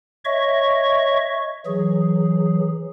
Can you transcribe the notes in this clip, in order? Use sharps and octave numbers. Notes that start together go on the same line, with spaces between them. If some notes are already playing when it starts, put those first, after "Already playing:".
C#5 D#5 E5 C#6
E3 F#3 G#4